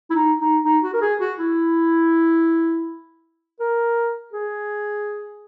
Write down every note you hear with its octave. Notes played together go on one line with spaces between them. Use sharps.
E4
D#4
D#4
D#4
F#4
A#4
G#4
F#4
E4
A#4
G#4